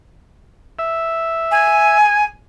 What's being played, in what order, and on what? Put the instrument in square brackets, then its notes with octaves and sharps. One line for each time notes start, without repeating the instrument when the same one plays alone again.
[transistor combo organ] E5
[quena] G#5